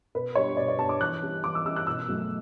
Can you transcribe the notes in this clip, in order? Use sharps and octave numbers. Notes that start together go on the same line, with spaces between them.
B2 B4
G3 B3 D4 C#5
B2 D5
D5
G3 B3 D4 A5
D6
E3 F#6
G3 C#4 E4
E3 D6
E6
G3 C#4 E4 E6
F#6
B2 E6
F#3 A3